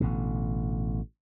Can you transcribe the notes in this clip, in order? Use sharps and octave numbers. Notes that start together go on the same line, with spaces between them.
A1 B2 D3